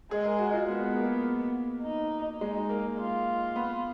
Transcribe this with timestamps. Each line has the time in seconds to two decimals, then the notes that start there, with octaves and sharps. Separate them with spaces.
0.11 G#3 G#4
0.25 A#4
0.39 F#4
0.54 F4
0.68 G#3 B3
0.97 A#3
1.83 D#4
2.41 G#3 D#4
2.69 A#3
2.98 F4
3.56 B3